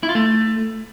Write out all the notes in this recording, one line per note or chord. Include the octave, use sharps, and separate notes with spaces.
E4
F4
A3